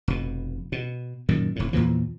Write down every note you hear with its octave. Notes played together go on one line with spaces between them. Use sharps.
F1 B2
B2
F#2 A#2 D#3
F1 A2
E2 A#2 E3 F3